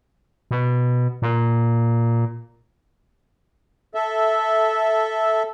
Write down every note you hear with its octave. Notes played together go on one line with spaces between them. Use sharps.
B2
A#2
A4 E5